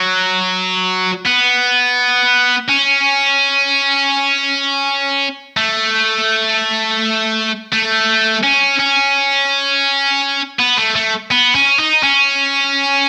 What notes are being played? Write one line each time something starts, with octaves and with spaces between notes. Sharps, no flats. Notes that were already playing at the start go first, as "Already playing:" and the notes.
Already playing: F#3
B3
C#4
A3
A3
C#4
C#4
B3
A3
A3
B3
C#4
D#4
C#4